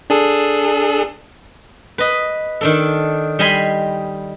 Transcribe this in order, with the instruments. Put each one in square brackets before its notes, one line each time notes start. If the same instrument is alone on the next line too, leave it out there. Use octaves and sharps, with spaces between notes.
[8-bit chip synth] D4 G#4 A4
[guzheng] B4 D#5
D#3 D4 A4
G3 D#5 G#5 B5 C6